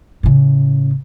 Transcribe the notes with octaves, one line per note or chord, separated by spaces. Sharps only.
A2 C#3